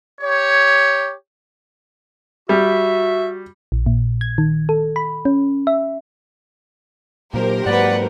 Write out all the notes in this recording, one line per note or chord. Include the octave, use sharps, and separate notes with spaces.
G4 C#5
G3 F#4 E5
A#1
A#2
G#6
D#3
A4
B5
C#4
E5
A#2 F#3 G4 A#4 C5
G#2 F#3 A#3 B4 D5 F#5